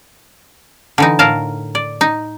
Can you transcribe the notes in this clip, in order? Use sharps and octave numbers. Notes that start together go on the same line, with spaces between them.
D3 E3 D#4
A2 A#4 F5 A5
D5
D#4